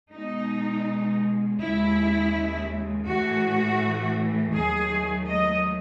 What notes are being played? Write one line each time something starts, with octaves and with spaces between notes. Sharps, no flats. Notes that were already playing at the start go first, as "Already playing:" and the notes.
B2 G#3 D#4
D#2 C#3 G#3 E4
A2 E3 A3 F#4
D#2 D#3 F#3 A3 G#4
D#5